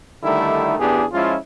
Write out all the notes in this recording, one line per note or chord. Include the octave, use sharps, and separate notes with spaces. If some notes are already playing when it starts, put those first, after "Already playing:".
D3 D#3 G3 A3 D#4 E4
A1 E2 B3 D4 G4 G#4
F3 G#3 C#4 E4 F4